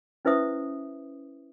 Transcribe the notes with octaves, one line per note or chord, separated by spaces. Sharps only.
C#4 E4 B4 C5 E5 D#6